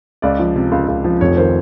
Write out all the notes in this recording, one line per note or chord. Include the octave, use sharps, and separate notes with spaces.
C#2 D5
F3
C3
C#2
C#2
F3
F1 C#5
D#3 C5